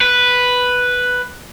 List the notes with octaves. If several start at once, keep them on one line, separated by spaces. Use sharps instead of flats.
B4